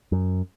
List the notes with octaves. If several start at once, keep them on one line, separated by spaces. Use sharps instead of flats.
F#2